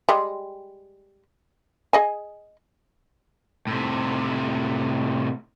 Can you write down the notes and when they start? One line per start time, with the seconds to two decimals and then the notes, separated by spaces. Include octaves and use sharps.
0.09 G3 G#3
1.93 G#4 D#5 G#5
3.67 A2 C3